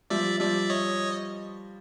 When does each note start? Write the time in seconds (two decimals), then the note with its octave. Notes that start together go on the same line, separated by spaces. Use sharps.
0.10 F3 G3 D5 E5
0.40 F3 G3 D5 E5
0.70 C#5 D#5